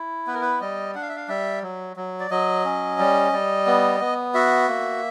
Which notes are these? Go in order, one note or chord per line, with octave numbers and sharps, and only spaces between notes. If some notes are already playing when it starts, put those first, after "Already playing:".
Already playing: E4
B3 B4
A#4
B4
G3 D#5
D4 F#5
F5
E5
F5
G3 E5
F#3
F#3
D5
F#3 D#5
C#4
G3
G3
B3
B3
F#4 E5
A#3